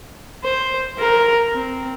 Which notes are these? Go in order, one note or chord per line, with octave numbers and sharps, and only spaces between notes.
C5
A#4
C4